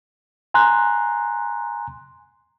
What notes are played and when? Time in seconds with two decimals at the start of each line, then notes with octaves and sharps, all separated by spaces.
0.54 G#5 A#5 C6 F#6